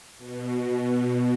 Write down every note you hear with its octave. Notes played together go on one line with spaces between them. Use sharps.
B2
B2